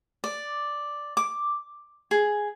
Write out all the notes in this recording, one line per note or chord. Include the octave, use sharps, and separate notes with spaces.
D5
D6
G#4